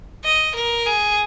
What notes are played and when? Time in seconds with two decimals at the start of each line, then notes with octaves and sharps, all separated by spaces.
0.24 D#5
0.56 A#4
0.87 G#4